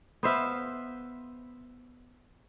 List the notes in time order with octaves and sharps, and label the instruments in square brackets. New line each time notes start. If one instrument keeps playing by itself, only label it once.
[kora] B3 C5 E5 F5